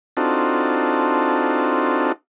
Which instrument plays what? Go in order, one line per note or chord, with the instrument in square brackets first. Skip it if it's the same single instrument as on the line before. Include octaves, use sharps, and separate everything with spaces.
[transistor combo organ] C4 D4 D#4 F4 F#4 A4